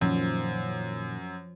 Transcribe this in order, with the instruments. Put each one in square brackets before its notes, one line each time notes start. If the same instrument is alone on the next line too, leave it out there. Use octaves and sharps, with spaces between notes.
[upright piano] F#2 [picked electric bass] A#2 D#3 [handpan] F3